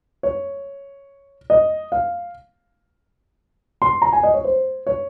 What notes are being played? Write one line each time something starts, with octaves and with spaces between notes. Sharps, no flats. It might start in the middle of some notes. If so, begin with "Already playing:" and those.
C#5
D#5
F5
C6
A#5
G#5
D#5
C#5
C5
C#5